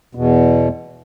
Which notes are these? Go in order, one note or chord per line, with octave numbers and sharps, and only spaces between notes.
E2 B2